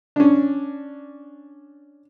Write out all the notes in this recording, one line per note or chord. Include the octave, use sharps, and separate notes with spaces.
C#4 D4